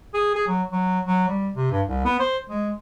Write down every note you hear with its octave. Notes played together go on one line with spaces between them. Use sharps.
G#4
G#4
F#3
F#3
F#3
G3
C3
G2
C2
B3
C5
G#3